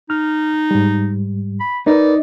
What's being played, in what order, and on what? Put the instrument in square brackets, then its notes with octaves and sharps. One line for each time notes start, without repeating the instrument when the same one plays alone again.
[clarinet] D#4 [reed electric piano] F6
[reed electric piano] G#2 G3
[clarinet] B5
[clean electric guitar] D#4 [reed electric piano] A#4 B4 [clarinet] D5